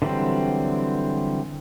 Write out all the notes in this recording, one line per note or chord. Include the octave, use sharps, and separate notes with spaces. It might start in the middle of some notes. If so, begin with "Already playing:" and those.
D3 E3 F#3 G3 C4